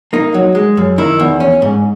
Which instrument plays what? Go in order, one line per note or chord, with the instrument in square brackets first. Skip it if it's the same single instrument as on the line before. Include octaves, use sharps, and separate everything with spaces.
[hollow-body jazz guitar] A#3 D#4
F#3
G#3
F#2
D#3 E4
E2
C#4
G#2